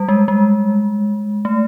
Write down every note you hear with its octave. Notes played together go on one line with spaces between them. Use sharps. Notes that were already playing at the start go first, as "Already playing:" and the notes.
Already playing: G3
G#3
G#3
A3